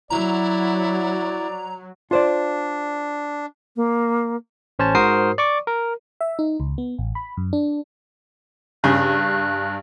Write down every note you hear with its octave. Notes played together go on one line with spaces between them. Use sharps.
F#3 E4 D5 A#5
D4 F4 C5 D5
A#3
A1 C#4 C5 C#5 A5
G#2 F#4 A#4 C5 D#6 C7
D5 C#6 D6
A#4
E5
D#4
C#2
B3
A1
B5
F#2
D4
G2 C#3 F#6